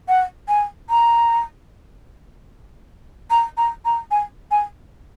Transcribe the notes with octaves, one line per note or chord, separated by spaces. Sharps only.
F#5
G#5
A#5
A#5
A#5
A#5
G#5
G#5